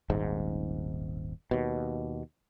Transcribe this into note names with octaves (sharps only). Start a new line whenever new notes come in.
D#1 G#1 G#2
D#2 B2